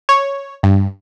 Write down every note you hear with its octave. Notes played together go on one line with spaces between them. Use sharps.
C#5
G2